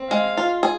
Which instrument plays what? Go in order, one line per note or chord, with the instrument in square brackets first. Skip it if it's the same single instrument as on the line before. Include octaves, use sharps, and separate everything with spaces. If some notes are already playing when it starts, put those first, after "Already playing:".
Already playing: [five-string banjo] C4
[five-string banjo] G#3 [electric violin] F5
[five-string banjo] F4
G#4